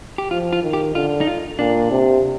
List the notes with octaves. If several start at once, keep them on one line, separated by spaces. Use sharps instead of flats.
G4
F3 F4
F4
D#3
G4
D3 F4
D#4
F4
A#2 D4
C3